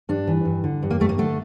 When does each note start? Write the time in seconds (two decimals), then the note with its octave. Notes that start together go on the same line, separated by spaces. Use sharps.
0.09 G2 D4
0.27 E3
0.45 G2
0.64 D3
0.83 G2
0.90 A#3
1.00 G2 A3
1.09 A#3
1.18 D3 A3